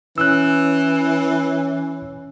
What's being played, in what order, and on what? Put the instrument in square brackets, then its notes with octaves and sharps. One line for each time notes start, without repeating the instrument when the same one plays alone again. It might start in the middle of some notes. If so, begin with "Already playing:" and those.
[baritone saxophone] E3 [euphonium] C#4 [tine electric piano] E6 F#6